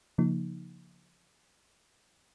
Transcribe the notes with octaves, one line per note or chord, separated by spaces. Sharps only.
C#3 F3 A#3 D#4